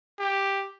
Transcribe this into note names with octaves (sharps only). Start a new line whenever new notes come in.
G4